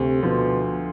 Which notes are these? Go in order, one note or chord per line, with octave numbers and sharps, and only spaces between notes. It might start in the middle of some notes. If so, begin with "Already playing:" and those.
Already playing: D2 C3
B2 D3 F3